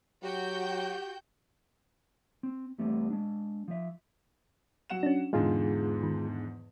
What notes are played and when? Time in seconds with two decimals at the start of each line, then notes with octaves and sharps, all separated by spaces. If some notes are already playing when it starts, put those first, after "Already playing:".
0.23 F#3 F#4 G4 G5 G6
2.43 C4
2.78 E2 G3 A3 B3 C4
3.10 G#3 D4
3.68 F3 E5
4.90 F#3 F#5 E7
5.03 C#4 D4
5.33 E2 G#2 D3 G#3 F4 G#4
6.03 D#3